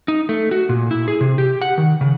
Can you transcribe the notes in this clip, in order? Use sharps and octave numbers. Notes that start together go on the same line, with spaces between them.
D#4
A3
F#4
A#2
E4
G#4
C3
G4
F#5
D#3
C#3